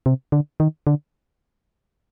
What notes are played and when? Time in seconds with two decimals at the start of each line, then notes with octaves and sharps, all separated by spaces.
0.06 C3
0.32 D3
0.60 D#3
0.87 D3